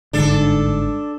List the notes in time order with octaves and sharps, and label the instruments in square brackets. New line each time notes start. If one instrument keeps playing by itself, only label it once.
[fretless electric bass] G1 G#2 D3 [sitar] D4 A4